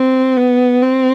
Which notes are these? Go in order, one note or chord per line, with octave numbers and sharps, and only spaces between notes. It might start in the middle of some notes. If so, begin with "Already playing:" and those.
Already playing: C4
B3
C4